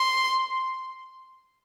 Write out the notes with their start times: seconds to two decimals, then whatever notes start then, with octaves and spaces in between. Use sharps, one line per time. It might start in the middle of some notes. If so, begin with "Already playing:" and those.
Already playing: C6